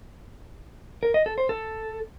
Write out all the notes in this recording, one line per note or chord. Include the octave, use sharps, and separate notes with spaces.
A#4
D#5
A4
C5
A4